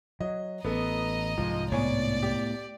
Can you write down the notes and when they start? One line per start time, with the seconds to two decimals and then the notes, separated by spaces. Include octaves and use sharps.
0.20 F#3 D#5
0.65 A1 B3 A4 D#5 A#5
1.38 C2 G#2 F3 G#3
1.72 A2 B3 C#5 D5 G#5
2.23 G4